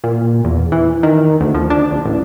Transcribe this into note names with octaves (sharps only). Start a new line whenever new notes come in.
A#2
E2
E3
D#3
D2
F3
D4
D1
A1